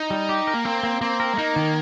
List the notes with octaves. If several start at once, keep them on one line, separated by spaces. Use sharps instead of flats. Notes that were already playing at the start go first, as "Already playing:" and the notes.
Already playing: D#4
G3
G4
A#4
A#3
A#3 C4
A#3
A#3 C4
A#4
G#3
A#3 D#4
D#3